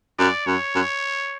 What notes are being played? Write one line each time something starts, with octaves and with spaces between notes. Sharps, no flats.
F#2 D5
F#2 C#5
F#2